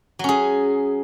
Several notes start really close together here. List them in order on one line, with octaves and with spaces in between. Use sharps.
F#3 C#4 G#4